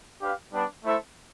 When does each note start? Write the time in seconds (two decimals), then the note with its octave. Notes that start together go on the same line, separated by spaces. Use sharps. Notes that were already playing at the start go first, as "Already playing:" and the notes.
0.21 D4 G4 B4 F5
0.52 G3 B3 D4
0.85 A3 E4 A4 C5 E5